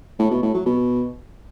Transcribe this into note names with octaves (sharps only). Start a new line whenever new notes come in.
A2
B2
A2
F#3
B2